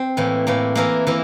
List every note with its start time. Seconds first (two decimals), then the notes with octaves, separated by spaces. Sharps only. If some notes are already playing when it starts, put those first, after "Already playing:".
Already playing: C4
0.17 A2 E3 A#3
0.47 A2 E3 A#3
0.75 E3 A#3 E4 A#4
1.07 E3 A#3 E4